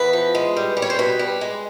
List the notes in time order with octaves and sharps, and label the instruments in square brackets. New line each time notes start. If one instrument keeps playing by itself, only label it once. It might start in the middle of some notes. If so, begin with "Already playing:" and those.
Already playing: [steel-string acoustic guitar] E2 B4
F3
G#3
G3
G3
C#5
C5
B2 B4
G3
G#3